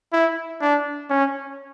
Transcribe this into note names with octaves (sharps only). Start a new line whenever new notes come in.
E4
D4
C#4